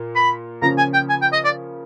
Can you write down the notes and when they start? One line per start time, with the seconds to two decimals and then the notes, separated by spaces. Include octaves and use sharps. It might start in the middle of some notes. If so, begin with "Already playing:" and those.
Already playing: A#2 A#3
0.15 B5
0.62 C#3 F3 A#3 C#4 F4 A#5
0.78 G#5
0.94 G5
1.09 G#5
1.22 G5
1.33 D#5
1.45 D5